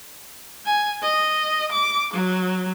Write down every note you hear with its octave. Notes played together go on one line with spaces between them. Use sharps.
G#5
D#5
D6
F#3